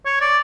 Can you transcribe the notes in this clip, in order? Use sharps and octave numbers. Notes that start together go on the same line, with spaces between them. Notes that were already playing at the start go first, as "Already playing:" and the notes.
C#5
D5